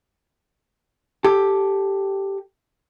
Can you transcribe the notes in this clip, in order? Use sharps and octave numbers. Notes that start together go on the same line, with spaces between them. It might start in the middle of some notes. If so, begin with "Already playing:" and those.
G4 A4